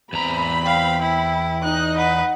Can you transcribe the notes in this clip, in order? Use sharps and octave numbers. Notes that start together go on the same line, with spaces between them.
E2 C4 A#5 B5
F5 G5
E4
D#4 D#5 F#6
B4 F#5